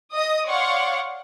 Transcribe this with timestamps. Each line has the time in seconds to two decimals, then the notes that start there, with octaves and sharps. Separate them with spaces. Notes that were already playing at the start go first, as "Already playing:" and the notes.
0.12 D#5 D#6
0.47 C#5 D5 F5 F#5 C6 C#6